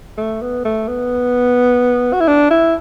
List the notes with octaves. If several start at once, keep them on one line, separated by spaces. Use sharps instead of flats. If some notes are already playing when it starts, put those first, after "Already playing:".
A3
B3
A3
B3
F#4
E4
D4
E4